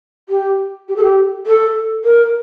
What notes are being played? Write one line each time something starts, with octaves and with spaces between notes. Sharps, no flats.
G4
G4
A4
G4
A4
A#4